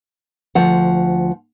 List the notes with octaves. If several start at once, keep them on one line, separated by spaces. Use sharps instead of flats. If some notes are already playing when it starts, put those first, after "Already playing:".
D2 F3 F#5